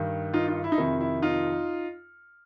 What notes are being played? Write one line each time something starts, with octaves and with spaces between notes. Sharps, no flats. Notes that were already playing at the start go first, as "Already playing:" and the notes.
Already playing: G2 D#3
D#4 F4
D#4 F4
E4
D#4
F2 C3 D#3 E4
E4
D#4 F4